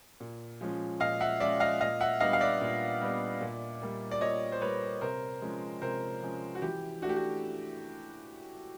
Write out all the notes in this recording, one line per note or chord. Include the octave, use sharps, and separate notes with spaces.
A#2
F3 G#3 C#4
A#2 D#5 F5
E5 F#5
F3 G#3 C#4 D5 E5
D#5 F5
A#2 D#5 F5
E5 F#5
G3 B3 D4 D#5 F5
F5
D5 E5
A#2
G3 B3 D4
A#2
G3 A#3
D5
A#2 C#5 D#5
C5
G3 A#3 B4 C#5
C3 A#4 C5
F3 G#3 C#4
C3 A#4 C5
F3 G#3 C#4
F#4
E3 G4
A3 D4 F#4
G4
F#4